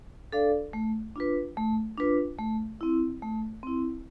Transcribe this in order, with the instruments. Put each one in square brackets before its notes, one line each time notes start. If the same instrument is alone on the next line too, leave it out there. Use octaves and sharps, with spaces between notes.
[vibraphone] D4 A4 D5 F5
A3
D4 F4 B4
A3
D4 F4 B4
A3
C4 E4
A3
C4 E4